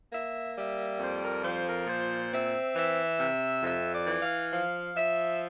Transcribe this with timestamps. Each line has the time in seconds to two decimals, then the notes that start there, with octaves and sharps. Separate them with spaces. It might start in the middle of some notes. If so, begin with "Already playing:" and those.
0.11 A#3 E5
0.55 G3 E5
1.00 F2 C5
1.21 A#4
1.43 F3 C5
1.65 A#4
1.87 A#2 C5
2.31 C4 E5
2.75 E3 E5
3.20 C3
3.63 F2 E5
3.93 D5
4.07 E3
4.22 F5
4.51 F3 F5
4.95 F3 E5